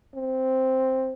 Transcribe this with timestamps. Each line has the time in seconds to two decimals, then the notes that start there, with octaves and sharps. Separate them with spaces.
0.15 C4